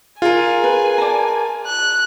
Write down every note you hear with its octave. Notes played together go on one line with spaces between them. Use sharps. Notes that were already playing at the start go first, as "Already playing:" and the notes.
F4 G#4 A#4 G#5
B4
D5 A5 A#5
F#6